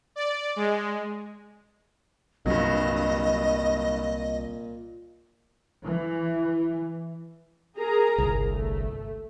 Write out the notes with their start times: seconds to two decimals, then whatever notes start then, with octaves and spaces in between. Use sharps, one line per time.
0.16 D5
0.56 G#3
2.46 C2 G2 A#2 F#3 D#5
5.86 E3
7.76 G#4 A#4 A#5
8.18 G1 C2
8.48 A3